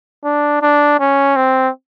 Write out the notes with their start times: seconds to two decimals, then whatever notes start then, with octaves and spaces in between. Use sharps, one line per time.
0.24 D4
0.62 D4
1.00 C#4
1.36 C4